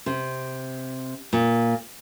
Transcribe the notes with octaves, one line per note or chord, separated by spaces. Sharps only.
C3
A#2